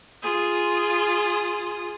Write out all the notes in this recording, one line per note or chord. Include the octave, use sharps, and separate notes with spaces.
F4 G#4